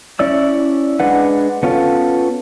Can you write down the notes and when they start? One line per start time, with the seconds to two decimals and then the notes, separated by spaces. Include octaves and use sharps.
0.19 C#4 E4 D5 E6
1.00 G#3 D4 B4 F#5
1.63 B3 C#4 F4 A4